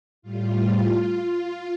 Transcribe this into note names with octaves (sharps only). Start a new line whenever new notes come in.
A2 G3 F4